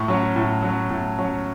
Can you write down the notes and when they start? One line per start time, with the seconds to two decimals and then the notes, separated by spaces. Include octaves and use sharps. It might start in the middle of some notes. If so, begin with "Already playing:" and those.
Already playing: A2 C#6
0.08 F#3 C#4
0.36 A2
0.63 F#3 C#4
0.90 A2
1.19 F#3 C#4